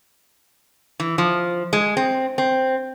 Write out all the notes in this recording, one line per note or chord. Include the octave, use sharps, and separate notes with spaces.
E3
F3
G#3
C4
C4